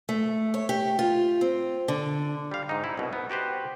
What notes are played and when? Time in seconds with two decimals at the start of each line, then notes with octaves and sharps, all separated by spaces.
0.09 A3
0.54 C#5
0.69 G4
0.99 F4
1.41 C4
1.88 D3
2.51 G3 F5
2.69 G#2 D#4
2.84 E4
2.97 C2 B2
3.13 B3
3.30 F#4 G4 B4 C5